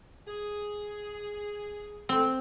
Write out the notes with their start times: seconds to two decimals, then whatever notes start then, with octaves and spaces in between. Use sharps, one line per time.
0.27 G#4
2.09 C4